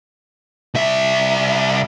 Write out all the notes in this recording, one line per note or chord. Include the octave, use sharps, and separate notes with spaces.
C2 E5